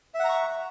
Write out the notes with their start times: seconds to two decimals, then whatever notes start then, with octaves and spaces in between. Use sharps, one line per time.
0.14 E5
0.19 F#5
0.24 A#5
0.29 C#6